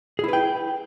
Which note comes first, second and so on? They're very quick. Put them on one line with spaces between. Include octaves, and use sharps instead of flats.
G#4 E4 B4 G5